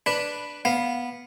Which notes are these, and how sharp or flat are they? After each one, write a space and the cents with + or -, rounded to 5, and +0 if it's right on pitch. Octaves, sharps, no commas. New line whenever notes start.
D4 +0 B4 +0
B3 -10 F5 +0